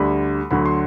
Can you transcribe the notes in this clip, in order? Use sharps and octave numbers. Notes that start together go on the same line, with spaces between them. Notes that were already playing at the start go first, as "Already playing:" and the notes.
Already playing: D2 D3 G3 B5
D2 D3 F#3 B5
C6